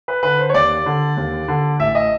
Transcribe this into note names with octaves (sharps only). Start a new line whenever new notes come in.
B4
D3 B4
C5
C#5
D#2 D5
D3
D#2
D3
A1 E5
D#5